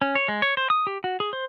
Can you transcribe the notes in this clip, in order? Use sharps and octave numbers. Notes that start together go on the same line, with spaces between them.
C#4
C#5
G#3
C#5
C5
D#6
G4
F#4
G#4
C5